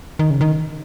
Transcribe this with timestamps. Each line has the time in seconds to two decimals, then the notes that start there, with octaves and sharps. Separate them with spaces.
0.19 D#3
0.30 C#3
0.41 D#3